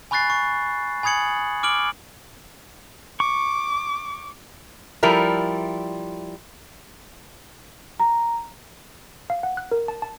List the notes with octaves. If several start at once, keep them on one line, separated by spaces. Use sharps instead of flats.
G#5 B5 C#6 F#6 A6 C7
C#6
G#5 B5 D#6 G#6 C#7 F#7
D6 F6 D7 F#7
C#6 D6
F3 G3 E4 A#4
A#5
F5
F#5
F#6
A#4
A5
A5